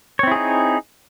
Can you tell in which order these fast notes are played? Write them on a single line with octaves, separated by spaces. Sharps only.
C#5 C4 E4 G#4 D#4